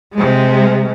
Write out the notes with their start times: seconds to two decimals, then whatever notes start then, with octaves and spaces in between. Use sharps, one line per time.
0.14 C3 G#3